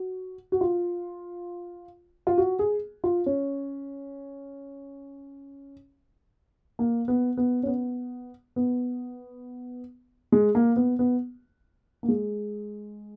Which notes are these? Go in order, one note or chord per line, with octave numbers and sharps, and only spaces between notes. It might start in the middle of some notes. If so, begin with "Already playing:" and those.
Already playing: F#4
F#4
F4
F4
F#4
G#4
F4
C#4
A#3
B3
B3
C#4
B3
B3
G#3
A#3
B3
B3
A#3
G#3